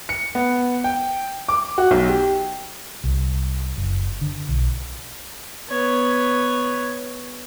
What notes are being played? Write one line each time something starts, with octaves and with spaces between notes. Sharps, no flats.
C#7
B3
G5
D6
F#4
B1
G4
C2
F#1
D3
B1
B3 C#5